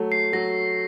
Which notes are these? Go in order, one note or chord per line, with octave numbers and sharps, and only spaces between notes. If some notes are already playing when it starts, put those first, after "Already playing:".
Already playing: F#3 A3
C7
F#3 A#6